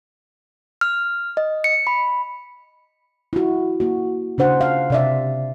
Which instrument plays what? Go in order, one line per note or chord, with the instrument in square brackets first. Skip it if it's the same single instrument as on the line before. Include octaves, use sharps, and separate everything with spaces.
[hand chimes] F6
D#5
C#7
B5
[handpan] E4 F#4
A#3 F#4
C#3 D4 C5 F#5
F5
C3 D5 E5